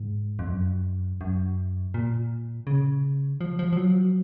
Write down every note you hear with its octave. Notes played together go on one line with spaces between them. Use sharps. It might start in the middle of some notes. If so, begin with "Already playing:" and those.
Already playing: G#2
F2
F#2
F#2
A#2
C#3
F3
F3
F3
F#3